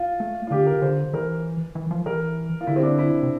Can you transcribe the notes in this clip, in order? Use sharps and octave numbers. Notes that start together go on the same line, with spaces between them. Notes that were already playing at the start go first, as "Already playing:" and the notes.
Already playing: F4
A3
F4
D3 G4
A#4
D3 C5
E3 A#4
E3
F3
E3 A#4
F4
D3 E4
C4
D4
E4
C3